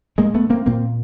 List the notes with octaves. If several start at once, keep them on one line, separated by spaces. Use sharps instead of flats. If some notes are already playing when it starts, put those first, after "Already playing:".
A2 G#3 A#3
A3 B3
A#3 C4
A#2 A#3 C4